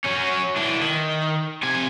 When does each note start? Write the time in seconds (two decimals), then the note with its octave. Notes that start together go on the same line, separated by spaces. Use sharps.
0.04 F#3 C#4
0.56 E3 D4
0.82 D#3
1.64 C3 G#5